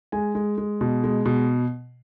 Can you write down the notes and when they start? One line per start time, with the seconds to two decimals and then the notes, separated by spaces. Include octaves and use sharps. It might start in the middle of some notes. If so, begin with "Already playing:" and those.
0.12 G#3 G#5
0.35 G#3
0.58 G#3
0.81 B2
1.04 G#3
1.25 B2